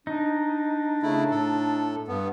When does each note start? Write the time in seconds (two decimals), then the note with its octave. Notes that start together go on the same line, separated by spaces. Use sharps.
0.07 D4 D#4
1.03 C#3 A3 E4
1.31 A2 A4
2.08 G2 B3